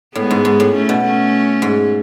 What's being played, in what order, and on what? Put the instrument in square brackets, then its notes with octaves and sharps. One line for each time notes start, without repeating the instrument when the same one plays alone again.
[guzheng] A2 [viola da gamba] G#3 B3
[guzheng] G#2
G#2
A2
[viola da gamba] A3 C#4
[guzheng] B2
[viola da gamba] A3 C#4
[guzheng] G#2